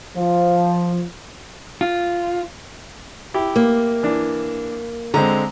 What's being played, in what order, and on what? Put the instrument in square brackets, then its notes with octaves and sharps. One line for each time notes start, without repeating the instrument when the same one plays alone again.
[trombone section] F3
[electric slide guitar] F4
[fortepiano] E4 G4
[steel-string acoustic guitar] A#3
[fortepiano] E3 D4
[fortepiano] D3 G#3 C4 [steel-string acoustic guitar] A#5